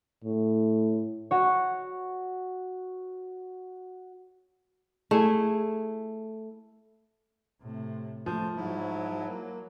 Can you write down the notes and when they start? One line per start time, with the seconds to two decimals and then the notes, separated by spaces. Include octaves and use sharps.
0.25 A2
1.31 F#4 C#5
5.11 A3 E4 G#4
7.61 A2 C3
8.26 F3 A3 C5
8.56 G#2 F#3 E4
9.28 A#3